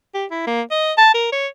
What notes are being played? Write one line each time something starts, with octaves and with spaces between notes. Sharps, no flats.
G4
E4
A#3
D#5
A5
A#4
C#5